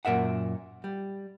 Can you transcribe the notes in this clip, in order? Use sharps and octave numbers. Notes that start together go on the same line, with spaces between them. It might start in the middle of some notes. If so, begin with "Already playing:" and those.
F#2 A#2 A#4 E5 F#5
G3